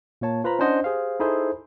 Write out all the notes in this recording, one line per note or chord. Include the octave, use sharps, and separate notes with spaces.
A#2 A#3 C#5 A5
F4 B4 C5 A#5 B5
C#4 D4 E4 C5 D#5 F#5
G4 G#4 C5 F5
D#4 E4 G#4 A4 C5